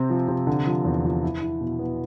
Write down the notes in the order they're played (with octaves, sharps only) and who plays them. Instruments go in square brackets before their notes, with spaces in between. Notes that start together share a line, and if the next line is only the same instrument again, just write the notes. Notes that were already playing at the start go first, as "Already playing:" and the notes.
Already playing: [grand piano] C3 C4
F3
C3
D3
F3
E2
F3
E4
E4
B2
B3